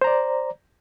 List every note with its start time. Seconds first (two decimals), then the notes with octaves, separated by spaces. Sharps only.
0.01 C5
0.04 A#5
0.07 D5